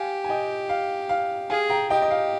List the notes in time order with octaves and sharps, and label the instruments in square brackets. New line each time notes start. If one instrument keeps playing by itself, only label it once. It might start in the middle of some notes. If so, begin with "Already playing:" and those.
Already playing: [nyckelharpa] G4 [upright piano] F5 G#5
[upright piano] G#5
D#5 G5
F5
F5
[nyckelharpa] G#4 [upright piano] F5 G#5
[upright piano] G5 A#5
[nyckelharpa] G4 [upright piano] D#5 G5
[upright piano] D#5
F5